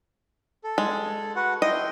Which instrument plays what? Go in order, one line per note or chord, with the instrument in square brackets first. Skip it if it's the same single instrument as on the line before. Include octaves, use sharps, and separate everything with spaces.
[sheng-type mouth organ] A4
[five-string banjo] G#3
[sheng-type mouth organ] F#4 B4 F#5
[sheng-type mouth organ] E4 G5 C6 [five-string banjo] D#5